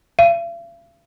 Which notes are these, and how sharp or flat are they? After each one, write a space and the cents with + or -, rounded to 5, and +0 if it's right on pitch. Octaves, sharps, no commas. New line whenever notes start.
F5 -45